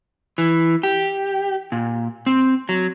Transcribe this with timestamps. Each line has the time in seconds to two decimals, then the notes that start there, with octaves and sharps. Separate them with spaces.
0.38 E3
0.83 G4
1.72 A#2
2.26 C4
2.69 F#3